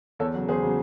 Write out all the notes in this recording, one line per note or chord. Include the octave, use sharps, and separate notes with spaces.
E2 A4 C#5
C#3 F#3
E2 G#4 C5
C#3 F#3